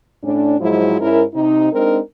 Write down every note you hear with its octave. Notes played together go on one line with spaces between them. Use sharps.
A2 C#4 D4
G#2 F3 F#3 G#3 E4
G#2 C#4 E4 A#4
C3 D#4
G#3 C4 D4 D#4 A#4